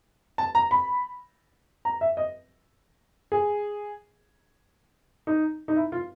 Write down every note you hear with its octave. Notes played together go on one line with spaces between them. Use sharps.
A5
A#5
B5
A#5
E5
D#5
G#4
D#4
D#4
E4
F4